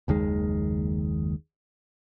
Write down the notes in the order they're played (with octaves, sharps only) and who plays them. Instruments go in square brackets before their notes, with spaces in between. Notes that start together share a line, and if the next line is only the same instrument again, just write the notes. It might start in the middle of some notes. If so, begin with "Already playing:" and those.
[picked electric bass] F#1 D#2 D#3 G#3